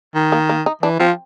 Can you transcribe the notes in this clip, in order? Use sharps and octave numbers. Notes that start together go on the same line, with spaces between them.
D#3
A#3
A#3
D#4
E3 D4
F3 C4